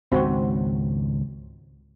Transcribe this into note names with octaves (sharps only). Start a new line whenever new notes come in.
C#2 G#2 D#3 C4 F#4